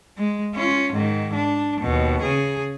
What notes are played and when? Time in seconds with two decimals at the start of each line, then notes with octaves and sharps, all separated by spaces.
0.17 G#3
0.55 C#4 F4
0.93 G#2 D#3
1.34 D4
1.81 D#2 B2
2.22 C#3 G#4